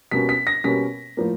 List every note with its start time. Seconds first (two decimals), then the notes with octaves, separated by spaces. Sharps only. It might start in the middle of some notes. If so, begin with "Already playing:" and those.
0.11 B2 G3 A#3 C#4 B6
0.29 B6
0.47 A#6
0.64 B2 G3 A#3 C#4 B6
1.17 A2 F3 A#3